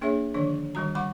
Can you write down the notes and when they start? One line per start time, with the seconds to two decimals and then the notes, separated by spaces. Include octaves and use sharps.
0.01 A#3 D4 G#4 C#5 E5
0.34 D3 D#3 F3 D4 C#5
0.75 D#3 F#3 G3 F#4 A#5
0.95 G3 F#5 B5 C#6 D6